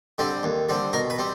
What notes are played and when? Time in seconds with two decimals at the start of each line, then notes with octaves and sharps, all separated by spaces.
0.18 D3 G3 C4
0.43 D#2
0.69 D3 G3 C4
0.93 B2 A#4
1.10 B4
1.18 G3 C4